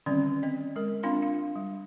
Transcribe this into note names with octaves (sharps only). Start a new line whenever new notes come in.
D3 D#3 G3 C4 C#4 D5
C4 D#5
G#3 A#4
C4 D4 F4 F5 B5 C6
F5
G3